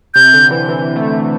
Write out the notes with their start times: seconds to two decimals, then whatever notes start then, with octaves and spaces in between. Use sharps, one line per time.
0.14 C3 G6
0.34 D3
0.51 E3
0.69 E3
0.96 A3